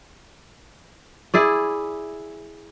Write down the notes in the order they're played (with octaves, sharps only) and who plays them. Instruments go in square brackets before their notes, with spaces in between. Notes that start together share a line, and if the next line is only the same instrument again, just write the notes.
[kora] E4 G#4 D5